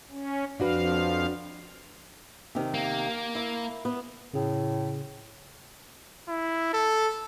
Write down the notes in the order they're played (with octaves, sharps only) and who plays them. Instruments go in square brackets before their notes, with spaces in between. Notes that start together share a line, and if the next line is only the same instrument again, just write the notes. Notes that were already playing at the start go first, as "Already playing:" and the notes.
[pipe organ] C#4
[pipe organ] F2 F3 F5 [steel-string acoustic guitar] D4 F#4 B4
[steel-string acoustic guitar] C3 D#3
[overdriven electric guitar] A#3
[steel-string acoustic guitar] E4
B3
[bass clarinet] A2 [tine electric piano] C#3 G#4
[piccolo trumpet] E4
A4